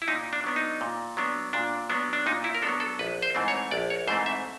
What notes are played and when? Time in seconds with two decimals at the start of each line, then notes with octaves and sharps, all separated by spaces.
0.02 E4
0.08 A#2 D#4
0.33 D4
0.44 F#3 B3 D4
0.56 D#4
0.81 A#2
1.17 F#3 B3 D4
1.53 A#2 D4
1.90 F#3 B3 D4
2.13 D4
2.26 A#2 D#4
2.44 E4
2.55 A#4
2.62 F#3 B3 D4 A4
2.80 A4
2.99 A#1 B4
3.22 C5
3.35 G#2 E3 A3 C4
3.48 C#5
3.71 A#1 D5
3.90 C#5
4.07 G#2 E3 A3 C4 C5
4.26 E5